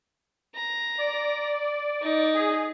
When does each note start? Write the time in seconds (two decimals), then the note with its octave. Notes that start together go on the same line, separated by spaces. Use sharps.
0.55 A#5
0.99 D5
2.01 D#4
2.34 G#4